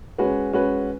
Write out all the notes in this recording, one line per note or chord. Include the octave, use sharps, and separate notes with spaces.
G#3 C#4 F#4 B4
G#3 C#4 F#4 B4